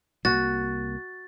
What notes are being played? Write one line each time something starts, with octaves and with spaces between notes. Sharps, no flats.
C2 A#3 F#4 A6